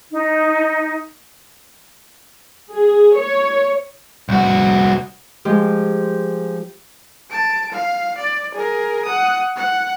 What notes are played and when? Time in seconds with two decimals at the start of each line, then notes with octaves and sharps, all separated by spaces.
0.12 D#4
2.72 G#4
3.16 C#5
4.29 C2 F#4
5.45 F3 G#3 G4
7.31 A5 D7
7.72 F5
8.17 D5
8.54 G#4 A#4
9.05 F#5 D#6
9.56 F#5